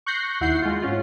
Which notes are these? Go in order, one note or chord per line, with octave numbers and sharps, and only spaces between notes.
C#6 F#6 G6 A#6 C7
D#2 E4 F#5 G6 C7
G#3 F4
G#2 C#4 F4